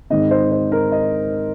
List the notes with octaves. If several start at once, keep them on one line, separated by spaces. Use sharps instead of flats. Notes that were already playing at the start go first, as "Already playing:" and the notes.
G#2 D#3 C4 D#5
C5
C5
A#4
D#5